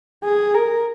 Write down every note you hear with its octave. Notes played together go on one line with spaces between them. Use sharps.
G#4
A#4